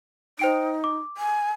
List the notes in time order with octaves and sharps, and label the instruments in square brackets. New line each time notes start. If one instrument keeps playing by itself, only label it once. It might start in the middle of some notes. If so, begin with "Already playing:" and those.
[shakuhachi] D#4 [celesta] C5 G5 D7
[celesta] D6
[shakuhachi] G#5